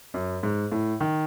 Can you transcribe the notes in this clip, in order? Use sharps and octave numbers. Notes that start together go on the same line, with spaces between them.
F#2
G#2
A2
D#3